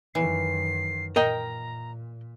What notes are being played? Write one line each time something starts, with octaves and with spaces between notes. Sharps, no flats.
F#2 D#3 E3 C7
A#2 A#4 D#5 G5 A#5